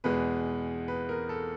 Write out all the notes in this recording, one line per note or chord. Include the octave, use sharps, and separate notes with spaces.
E2 B2 G#3 B4
B4
A#4
A4